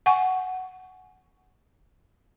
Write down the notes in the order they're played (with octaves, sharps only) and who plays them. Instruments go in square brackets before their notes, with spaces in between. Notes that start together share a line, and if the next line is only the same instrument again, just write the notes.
[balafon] F#5 G#5 C#6